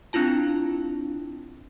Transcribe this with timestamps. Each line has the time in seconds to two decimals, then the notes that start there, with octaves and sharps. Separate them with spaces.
0.13 C4 D4 E4 F4 A5